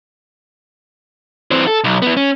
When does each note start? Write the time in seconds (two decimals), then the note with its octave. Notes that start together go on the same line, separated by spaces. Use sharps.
1.51 E3 C4
1.67 A4
1.84 B1
2.02 B3 E4
2.17 C#4